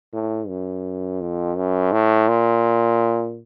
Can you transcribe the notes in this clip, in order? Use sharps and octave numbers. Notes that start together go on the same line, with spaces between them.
A2
F#2
F2
F#2
A2
A#2